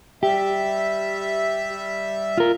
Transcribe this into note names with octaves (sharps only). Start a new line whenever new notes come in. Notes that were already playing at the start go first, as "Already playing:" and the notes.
G3 G4 E5
F4 A#4